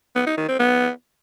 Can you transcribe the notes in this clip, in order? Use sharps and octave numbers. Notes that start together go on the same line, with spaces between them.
B3
D#4
D#3
C4
B3